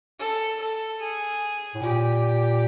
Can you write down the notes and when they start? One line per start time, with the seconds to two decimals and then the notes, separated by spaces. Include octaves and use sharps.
0.19 A4
0.60 A4
1.00 G#4
1.75 A2
1.82 A#2 G4